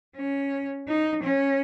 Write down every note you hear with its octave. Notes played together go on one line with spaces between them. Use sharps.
C#4
D#4
C#4